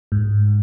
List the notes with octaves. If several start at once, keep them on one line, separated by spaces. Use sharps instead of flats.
G#2